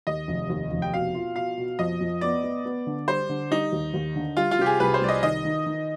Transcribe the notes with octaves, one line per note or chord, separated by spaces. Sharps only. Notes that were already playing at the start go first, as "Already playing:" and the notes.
D#2 D#5
F1
D#2
F1
G5
B2 F5
F4
B2 F5
B2
F2 D#5
F2
B3 D5
B3
B3
D3
G3 C5
D3
G3 D#4
D#2
D#2
D3
G3 F4
F4
C3 G4
G#4
C2 B4
C5
C2 D5
D#5
D#3 D#5
D#3
D#3